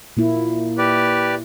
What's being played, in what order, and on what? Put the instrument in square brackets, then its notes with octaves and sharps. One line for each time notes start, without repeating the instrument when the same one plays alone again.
[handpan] A#2 A#3 E4
[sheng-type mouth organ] G4 B4 D5